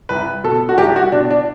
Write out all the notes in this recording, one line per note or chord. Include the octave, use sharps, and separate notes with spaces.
C2 B4
B2 A4
F#4
C2 G4
F#4
B2 D4
D4